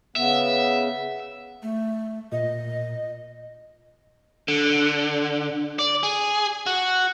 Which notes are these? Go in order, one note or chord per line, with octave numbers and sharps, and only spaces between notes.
C#3 B3 E5
A3
A#2 D#5
D3
D5
G#4
F#4